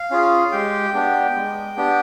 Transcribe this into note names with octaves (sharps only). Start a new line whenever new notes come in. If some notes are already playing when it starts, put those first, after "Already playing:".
Already playing: F5
C#4 F4 G#4
G#3 G4 G5
B3 D4 G4
G#3
B3 D4 G4